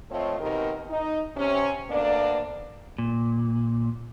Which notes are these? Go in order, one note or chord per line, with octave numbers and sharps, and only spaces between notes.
F3 A3 C4 F4 C#5 D#5
B2 D#3 C4 D#4 G4 A#4
D#4
C3 C#4
D2 A#3 B3 D4 D5
A#2